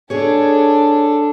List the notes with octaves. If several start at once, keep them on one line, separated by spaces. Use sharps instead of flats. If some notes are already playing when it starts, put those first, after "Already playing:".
D4 G#4 A4 C#5